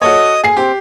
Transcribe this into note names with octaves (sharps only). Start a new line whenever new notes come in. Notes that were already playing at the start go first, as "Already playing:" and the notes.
F#4 A4 C#5 D#5 D#6
G#4 C7
C4 G4